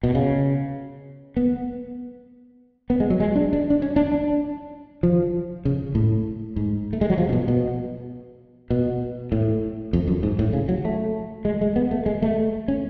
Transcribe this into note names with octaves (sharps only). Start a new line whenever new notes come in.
B2
C#3
B3
B3
G#3
F#3
G#3
D4
D4
D4
C#4
D4
D4
F3
C#3
A2
G#2
A3
G#3
F#3
F3
C#3
B2
B2
B2
A2
F2
F#2
G#2
A2
C#3
F#3
A3
G#3
G#3
B3
A3
G#3
A3
C#4